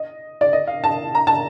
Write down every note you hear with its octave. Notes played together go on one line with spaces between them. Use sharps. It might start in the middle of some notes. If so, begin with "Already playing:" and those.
Already playing: D#5
D5
D#5
F5
A5
A#5
A5